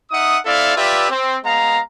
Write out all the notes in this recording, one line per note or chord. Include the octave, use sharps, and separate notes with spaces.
D#4 E5 F#5 D#6
C4 E4 A4 D5 E5 F5
F4 G4 B4 D5 E5
C4
G#3 B3 F5 A#5